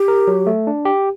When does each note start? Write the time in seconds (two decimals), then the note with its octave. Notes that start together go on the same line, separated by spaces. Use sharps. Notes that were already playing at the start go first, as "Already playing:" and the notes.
Already playing: G4
0.08 A#4
0.27 F#3
0.47 A3
0.67 D4
0.85 G4